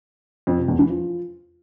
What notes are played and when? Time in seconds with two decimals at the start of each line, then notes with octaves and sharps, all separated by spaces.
0.47 F2
0.58 C3
0.68 E2
0.79 E3
0.90 F3